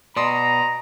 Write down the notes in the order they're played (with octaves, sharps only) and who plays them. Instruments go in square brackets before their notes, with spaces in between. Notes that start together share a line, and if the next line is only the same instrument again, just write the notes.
[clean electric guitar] B2 [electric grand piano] D5 C6 D#6 [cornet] A#5